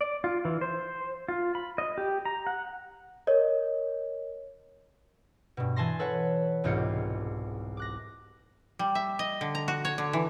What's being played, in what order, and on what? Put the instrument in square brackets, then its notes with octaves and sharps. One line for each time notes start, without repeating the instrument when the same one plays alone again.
[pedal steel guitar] D5
F4
E3
C5
F4
B5
D#5
G4
A#5
F#5
[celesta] A#4 C#5 D#5
[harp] G2 B2
E3 G#5 A5 C6 A#6
A4 B4 C#5 F#5
E1 C2 G#2 F4 G4 C#7
D6 F#6 A#6
[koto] G3
E5
D#5
D3
A#5
F#4
C#5
D3
E3